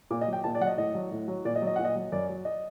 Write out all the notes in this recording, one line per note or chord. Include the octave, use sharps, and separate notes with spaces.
A#2 D6
D#5
F#3
G5
A#2 A5
D5
F#3 F#5
D#5
A2 D#5
F#3
A2
F#3
A#2 D5
D#5
F#3
D#5
A#2 F#5
D#5
F#3
F#2 D5
F#3
D#5